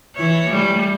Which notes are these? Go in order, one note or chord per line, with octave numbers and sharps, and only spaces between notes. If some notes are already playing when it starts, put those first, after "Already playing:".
E3 E4 C#5
G3 A3